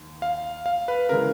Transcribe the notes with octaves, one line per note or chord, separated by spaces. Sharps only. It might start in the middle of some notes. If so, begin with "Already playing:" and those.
Already playing: D#2
F5
F5
B4
C#3 E3 G#3 A#4